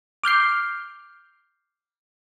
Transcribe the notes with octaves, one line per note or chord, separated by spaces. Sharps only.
D6 F6 G6 C7